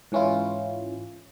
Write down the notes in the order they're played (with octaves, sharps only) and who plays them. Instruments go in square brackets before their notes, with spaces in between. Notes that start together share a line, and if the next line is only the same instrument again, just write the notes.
[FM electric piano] G#2 E3 C#4 E4 F4